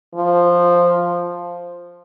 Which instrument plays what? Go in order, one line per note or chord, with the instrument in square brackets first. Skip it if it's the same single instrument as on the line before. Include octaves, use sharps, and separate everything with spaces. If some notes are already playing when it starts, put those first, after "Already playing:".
[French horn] F3